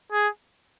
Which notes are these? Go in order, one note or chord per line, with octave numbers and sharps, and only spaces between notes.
G#4